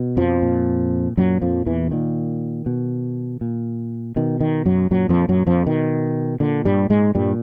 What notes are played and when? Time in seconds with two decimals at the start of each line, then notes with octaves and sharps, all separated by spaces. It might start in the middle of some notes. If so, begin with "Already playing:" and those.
Already playing: B2
0.17 F2 F3
0.42 A#2
1.17 F#2 A#2 F#3
1.41 F2 F3
1.66 E2 E3
1.91 A#2 D#3
2.66 B2
3.41 A#2
4.16 B2 D#3
4.41 D#3
4.66 F#2 F#3
4.91 F#2 A#2 F#3
5.09 F2 F3
5.29 F#2 F#3
5.47 F2 F3
5.66 B2 D#3
6.40 A#2 D3
6.65 G2 G3
6.90 G#2 G#3
7.15 G2 A#2 G3